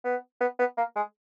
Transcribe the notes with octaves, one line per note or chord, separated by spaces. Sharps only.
B3
B3
B3
A#3
G#3